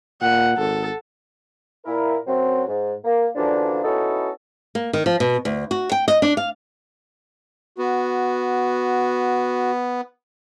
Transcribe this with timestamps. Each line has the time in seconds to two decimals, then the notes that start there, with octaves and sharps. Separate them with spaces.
0.21 A#2 F#5
0.57 G#1 A4
1.85 A#2 E4 A#4
2.27 F#2 F#3 C4
2.68 G#2
3.05 A#3
3.36 F#2 D3 E3 F3 A#3 D4
3.83 B3 C#4 D#4 E4 F#4 A4
4.75 A#3
4.93 D#3
5.06 F3
5.20 B2
5.45 D2
5.71 F#4
5.92 G5
6.08 D#5
6.22 D4
6.37 F5
7.78 B3 F#4